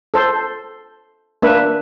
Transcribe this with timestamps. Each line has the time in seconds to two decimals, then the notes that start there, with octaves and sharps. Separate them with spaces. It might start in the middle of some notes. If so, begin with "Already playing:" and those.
0.14 A4 C5
1.42 A#3 D4 B4 E5